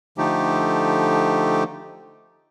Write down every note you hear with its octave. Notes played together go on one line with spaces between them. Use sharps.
D3 F3 A3 D#4 G4